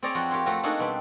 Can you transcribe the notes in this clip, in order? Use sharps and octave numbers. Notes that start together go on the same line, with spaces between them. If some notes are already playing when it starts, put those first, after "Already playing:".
C4 G#4 C#5 D5 A#5
F2 F4 F#4
G4 A#4 C#5 C6
A3 C4 F4 F#4
A#3 D4 D#4 F#4 G#4 A4
B2 G3 C4